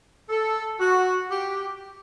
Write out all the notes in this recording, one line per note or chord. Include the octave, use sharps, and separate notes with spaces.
A4
F#4
G4